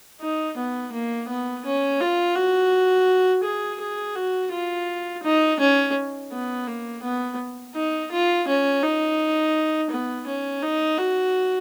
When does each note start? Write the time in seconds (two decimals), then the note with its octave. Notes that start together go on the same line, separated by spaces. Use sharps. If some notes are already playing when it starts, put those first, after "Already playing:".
0.21 D#4
0.57 B3
0.93 A#3
1.29 B3
1.65 C#4
2.00 F4
2.36 F#4
3.44 G#4
3.80 G#4
4.16 F#4
4.52 F4
5.23 D#4
5.60 C#4
6.32 B3
6.67 A#3
7.03 B3
7.75 D#4
8.11 F4
8.48 C#4
8.83 D#4
9.90 B3
10.27 C#4
10.63 D#4
10.98 F#4